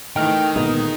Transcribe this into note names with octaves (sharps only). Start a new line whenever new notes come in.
D#3 E3 A3 D#4 G5 F6
A#2 D3 G#3 B3 D#4 G#4 D#6